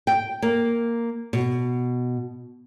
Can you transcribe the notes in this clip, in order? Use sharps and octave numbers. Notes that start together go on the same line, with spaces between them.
G5
A#3
B2